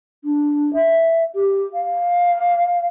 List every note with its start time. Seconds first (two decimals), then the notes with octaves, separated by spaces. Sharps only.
0.24 D4
0.73 E5
1.35 G4
1.73 F5